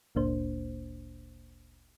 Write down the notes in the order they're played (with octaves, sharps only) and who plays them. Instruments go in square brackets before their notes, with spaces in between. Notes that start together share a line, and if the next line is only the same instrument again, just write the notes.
[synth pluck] G1 D2 A#2 A#3 D4 C5